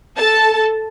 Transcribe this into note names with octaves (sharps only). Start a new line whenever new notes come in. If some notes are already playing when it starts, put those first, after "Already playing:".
A4 A5